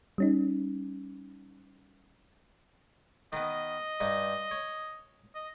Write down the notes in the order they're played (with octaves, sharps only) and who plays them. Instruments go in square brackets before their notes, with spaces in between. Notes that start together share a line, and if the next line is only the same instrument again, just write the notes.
[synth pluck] G3 C#4 D#4
[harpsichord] D#3 B3 [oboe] D#5
[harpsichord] G2 D#4
C#5
[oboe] D#5